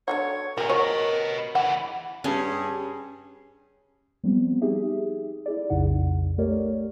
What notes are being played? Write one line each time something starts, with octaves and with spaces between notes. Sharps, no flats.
D3 E3 F#4 C#5
C3 F#4 G#4 A#4
F#3 F#4 B4 C#5 D#5
C#3 E3 F#5
G2 C#4 G#4
F3 G3 B3 C4
D#4 G4 G#4 E5
E4 G#4 D5
B1 F2 C#3 D#4 F#5
A3 G4 A#4 C#5 D5